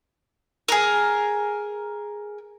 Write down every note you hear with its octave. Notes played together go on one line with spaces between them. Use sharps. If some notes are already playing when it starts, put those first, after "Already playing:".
G#4 A#4